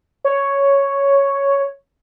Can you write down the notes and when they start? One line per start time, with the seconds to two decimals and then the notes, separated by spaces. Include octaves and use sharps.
0.25 C#5